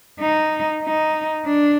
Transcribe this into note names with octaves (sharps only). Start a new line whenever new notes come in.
D#4
D#4
D4